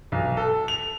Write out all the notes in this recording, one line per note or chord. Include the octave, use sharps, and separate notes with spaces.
B1
A4
F7